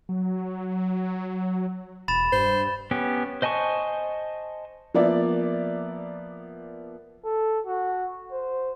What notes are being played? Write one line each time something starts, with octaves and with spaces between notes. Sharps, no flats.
F#3
E1 B5 A6 E7
G2 C5
B3 C#4 G4
C5 D#5 G#5 A5 C#6
F3 A#3 B3 D5 E5
A4
F#4
C5